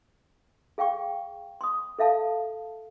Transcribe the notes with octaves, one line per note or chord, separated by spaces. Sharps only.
G#4 F5 G5 C#6
C6 D#6
A4 E5 F5 A5